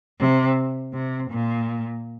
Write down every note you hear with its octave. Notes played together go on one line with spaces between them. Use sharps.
C3
C3
A#2